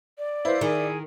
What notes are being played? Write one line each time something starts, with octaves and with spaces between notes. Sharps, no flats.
D5
E4 B4 C5 F5
D#3 G#4